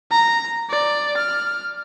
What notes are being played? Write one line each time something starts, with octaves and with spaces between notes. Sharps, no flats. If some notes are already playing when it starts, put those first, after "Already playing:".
A#5
D5
F6